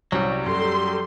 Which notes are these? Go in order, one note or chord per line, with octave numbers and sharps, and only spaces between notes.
C2 F#3 G3 C#4
F#2 G4 A4 C6